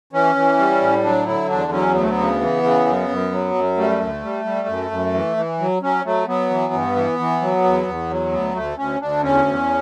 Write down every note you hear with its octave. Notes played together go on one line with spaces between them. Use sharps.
E3 C#4
E3
G3
A2
F#3 D4
D3 E4
E2 D4
F#3 C#4
D2 B3
A3
B3
C#3
E3
C#3
F#2
F#2
F#3
F#2
G3 A3
D2
G3
G3
F#2
F#2
E3
E3
F#3
F#3 C#4
F#3 A3
F#3 B3
E3
G2
E3
E3
F#3
E2
E2
F#3
D2 B3
D2 A3
D2 C#4
D2 D4
E2 C#4
E2